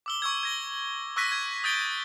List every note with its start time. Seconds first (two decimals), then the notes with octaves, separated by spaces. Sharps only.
0.06 D6 E6 G7
0.22 C#6 E6 G#6
0.43 G#6 A#6 G7
1.16 C#6 E6 F#6 A#6 B6 D#7
1.32 G#6
1.64 D#6 G6 A6 D7 G7